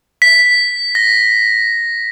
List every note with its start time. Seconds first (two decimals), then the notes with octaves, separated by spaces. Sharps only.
0.22 B6
0.95 A#6